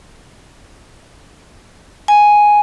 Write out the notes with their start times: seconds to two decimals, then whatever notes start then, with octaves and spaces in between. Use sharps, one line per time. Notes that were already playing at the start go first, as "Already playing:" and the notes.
2.08 G#5